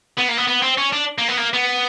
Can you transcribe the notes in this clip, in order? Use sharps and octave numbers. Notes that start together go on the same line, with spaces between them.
B3
A#3
B3
B3
C4
C#4
D4
A#3
B3
A#3
B3